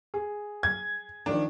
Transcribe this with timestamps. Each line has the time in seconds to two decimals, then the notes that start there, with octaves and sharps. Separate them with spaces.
0.14 G#4
0.63 G#6
1.26 D#3 F3 D4